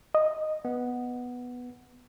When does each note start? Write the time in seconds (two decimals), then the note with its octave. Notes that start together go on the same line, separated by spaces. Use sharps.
0.14 D#5
0.65 B3